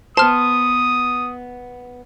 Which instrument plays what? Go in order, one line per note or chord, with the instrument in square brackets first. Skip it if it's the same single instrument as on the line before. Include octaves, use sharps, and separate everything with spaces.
[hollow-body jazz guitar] B3 C5 [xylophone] A5 F6 [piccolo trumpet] D#6